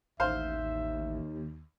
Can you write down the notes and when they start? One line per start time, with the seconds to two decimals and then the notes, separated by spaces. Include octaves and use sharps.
0.20 A1 D#2 C5 E5 F5